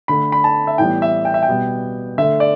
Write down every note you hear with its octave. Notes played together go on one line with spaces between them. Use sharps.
D3 A3 B5
B5
A5
E5
A2 E3 G3 B3 G5
E5
G5
E5
G5
B2 G3 B3
D3 A3 E5
D5